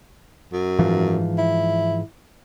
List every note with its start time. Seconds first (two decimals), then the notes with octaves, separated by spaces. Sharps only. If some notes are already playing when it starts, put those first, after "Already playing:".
0.52 F#2
0.79 G#2 E3 F3
1.38 E4